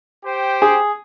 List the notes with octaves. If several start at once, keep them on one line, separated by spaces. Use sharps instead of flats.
G4 C5 G5
G#4